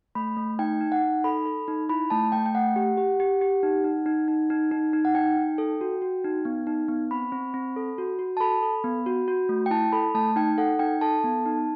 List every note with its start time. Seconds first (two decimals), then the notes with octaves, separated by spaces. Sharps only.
0.15 A3 B5
0.37 A3
0.59 D#4 G5
0.81 D#4
0.92 F#5
1.02 D#4
1.24 A4 B5
1.46 A4
1.68 D#4
1.89 E4 B5
2.10 A3 A5
2.32 A3 G5
2.46 G5
2.54 A3 F#5
2.76 G4
2.97 G4
3.20 G4
3.41 G4
3.63 D#4
3.84 D#4
4.06 D#4
4.28 D#4
4.50 D#4
4.71 D#4
4.93 D#4
5.05 F#5
5.15 D#4 G5
5.37 D#4
5.58 A4
5.81 F#4
6.02 F#4
6.24 D#4
6.45 B3
6.67 D#4
6.88 B3
7.11 C4 B5
7.32 C4
7.54 C4
7.76 A4
7.98 F#4
8.19 F#4
8.37 A5
8.40 A4 B5
8.62 A4
8.84 B3
9.06 F#4
9.28 F#4
9.49 A3
9.66 G5
9.71 E4 A5
9.92 A4 B5
10.15 A3 A5
10.36 D#4 G5
10.58 A4 F#5
10.79 D#4 G5
11.01 A4 A5
11.24 B3
11.46 D#4